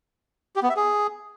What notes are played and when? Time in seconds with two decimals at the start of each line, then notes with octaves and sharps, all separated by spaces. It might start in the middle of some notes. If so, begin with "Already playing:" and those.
0.56 G4
0.63 B3
0.70 E5
0.76 G#4